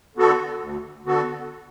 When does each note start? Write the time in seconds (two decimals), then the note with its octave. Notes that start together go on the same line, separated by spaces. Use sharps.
0.15 D3 B3 F#4 A4
0.61 D2
1.06 D3 B3 F#4 A4